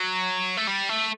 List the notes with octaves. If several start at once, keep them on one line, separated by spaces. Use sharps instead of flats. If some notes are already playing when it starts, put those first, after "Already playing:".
Already playing: F#3
A3
G3
A3